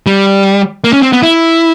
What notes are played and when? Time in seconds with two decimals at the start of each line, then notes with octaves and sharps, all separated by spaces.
0.07 G3
0.84 A#3
0.93 C#4
1.02 C4
1.13 B3
1.23 E4